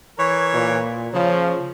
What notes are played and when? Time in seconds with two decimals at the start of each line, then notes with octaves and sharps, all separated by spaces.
0.18 E3 A#4 C#5
0.54 A#2
1.14 C#3 F3